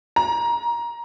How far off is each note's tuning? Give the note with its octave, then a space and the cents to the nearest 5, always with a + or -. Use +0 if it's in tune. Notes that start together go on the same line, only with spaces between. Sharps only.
A#5 +20